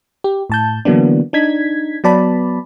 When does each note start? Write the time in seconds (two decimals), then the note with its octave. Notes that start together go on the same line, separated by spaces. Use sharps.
0.24 G4
0.50 A2 A5 G6
0.85 D3 E3 F#3 A#3 B3 D4
1.33 D4 D#4 G#6 B6
2.04 F#3 B3 D5 A5 B5